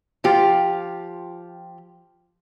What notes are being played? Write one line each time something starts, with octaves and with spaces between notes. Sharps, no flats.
F3 F4 G4